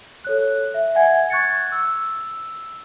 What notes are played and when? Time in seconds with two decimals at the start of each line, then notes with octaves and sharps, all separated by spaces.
0.25 A4 C#5 F#6
0.74 E5
0.95 E5 F#5 G#5 G#6
1.30 C#6 F#6 G#6 A6 C#7
1.72 E6